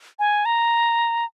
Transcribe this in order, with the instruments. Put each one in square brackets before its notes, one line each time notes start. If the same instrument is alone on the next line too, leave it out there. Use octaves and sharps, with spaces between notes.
[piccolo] G#5
A#5